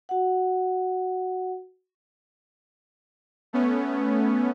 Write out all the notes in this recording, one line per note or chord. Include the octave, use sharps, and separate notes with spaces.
F#4 F#5
A3 B3 C#4